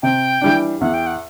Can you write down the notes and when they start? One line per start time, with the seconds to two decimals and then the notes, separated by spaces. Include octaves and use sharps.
0.03 C3 G5
0.41 E3 G3 D4
0.81 E2 F#5
0.94 G5
1.07 F#5